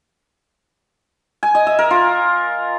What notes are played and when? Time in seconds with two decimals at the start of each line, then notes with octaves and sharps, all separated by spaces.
1.43 G#5
1.55 D#5
1.67 E5
1.79 A#4
1.91 F4